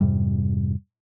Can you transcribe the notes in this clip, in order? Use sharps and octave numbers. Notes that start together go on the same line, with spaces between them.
F2 G#2 C3 G3